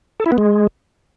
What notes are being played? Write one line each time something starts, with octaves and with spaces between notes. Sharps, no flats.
A4
E4
B3
G#3